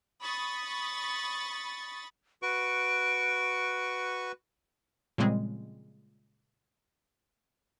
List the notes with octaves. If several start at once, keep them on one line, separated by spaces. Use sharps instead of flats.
B5 C#6 D#6 A6 B6
F#4 B4 C#6 D7
A#2 C#3 F3 G3 G#3 C4